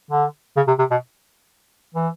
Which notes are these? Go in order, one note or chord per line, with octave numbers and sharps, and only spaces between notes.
D3
C#3
C3
C3
B2
E3